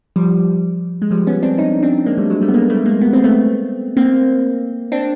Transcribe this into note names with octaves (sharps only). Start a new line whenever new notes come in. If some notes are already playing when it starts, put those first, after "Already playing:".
F3 G3
G#3
F3 G3
B3 C#4
C4 D4
C#4 D#4
C4 D4
G#3 A#3
G3 A3
F#3 G#3
G3 A3
B3
G#3 A#3
G3 A3
G#3 A#3
B3
C4
A3 B3
A#3 C4
C4 D4